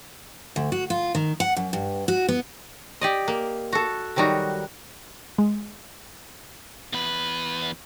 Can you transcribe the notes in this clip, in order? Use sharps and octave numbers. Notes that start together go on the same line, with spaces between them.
D2
F#4
F4
D#3
F#5
F#2
G2
F#4
B3
G4 D5 D#5
A#3
F#4 A4
D#3 F#3 G3 D#4 F#4
G#3
E2 B4